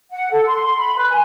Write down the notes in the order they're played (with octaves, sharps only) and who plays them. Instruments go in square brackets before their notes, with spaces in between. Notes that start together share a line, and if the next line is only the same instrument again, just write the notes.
[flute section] F#5
A4
C6
C6
B5
B4
G#5